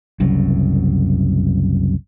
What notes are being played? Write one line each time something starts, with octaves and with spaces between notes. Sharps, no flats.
F#1 C2 F#2